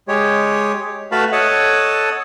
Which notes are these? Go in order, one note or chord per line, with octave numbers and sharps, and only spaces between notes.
G#3 G4 C#5
A3 F#4 B4 F5 A5 B5
A4 C#5 D#5 F#5 A5